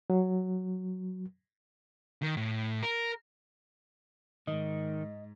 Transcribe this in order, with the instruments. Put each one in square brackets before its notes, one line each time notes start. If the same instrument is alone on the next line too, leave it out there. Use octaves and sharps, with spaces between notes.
[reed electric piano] F#3
[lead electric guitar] D#3
A2
A#4
[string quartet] G#2 [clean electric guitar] D#3 [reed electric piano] D#5